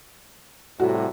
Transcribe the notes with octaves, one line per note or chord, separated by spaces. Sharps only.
A2 C3 G3 F#4